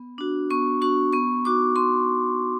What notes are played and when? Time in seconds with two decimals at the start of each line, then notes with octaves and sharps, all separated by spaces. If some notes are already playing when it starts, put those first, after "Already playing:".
Already playing: B3
0.18 D4 F#4
0.50 B3 C#6
0.81 D4 F#4 C#6
1.13 B3 C#6
1.45 D#4 F#4 D6
1.76 B3 C6